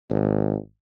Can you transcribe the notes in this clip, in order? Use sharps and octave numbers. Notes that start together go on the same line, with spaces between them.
G#1